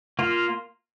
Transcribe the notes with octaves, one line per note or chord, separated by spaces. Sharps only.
A#3 F4